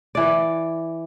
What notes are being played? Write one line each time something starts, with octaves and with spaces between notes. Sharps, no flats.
E3 D5